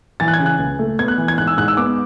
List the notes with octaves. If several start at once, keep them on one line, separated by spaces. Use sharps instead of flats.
E3 A6
F#6
G#6
C#3
F#6
C#2
A3
B3 G#6
F#6
E3
G#6
G#2 F#6
E6
G#2 F#6
E6
B3 D6